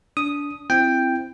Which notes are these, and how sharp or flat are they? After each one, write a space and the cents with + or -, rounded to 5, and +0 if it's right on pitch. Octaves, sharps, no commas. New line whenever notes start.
D4 -25 D#6 +0
C4 +0 E4 +20 G5 +5